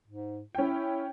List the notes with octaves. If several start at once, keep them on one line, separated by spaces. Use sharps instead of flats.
G#2
C#4 E4 G5